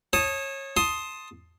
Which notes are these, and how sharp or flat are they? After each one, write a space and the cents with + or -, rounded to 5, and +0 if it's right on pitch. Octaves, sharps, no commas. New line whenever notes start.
C#5 -25 A5 +0 D#6 +0
A5 +0 C6 +10 D#6 +5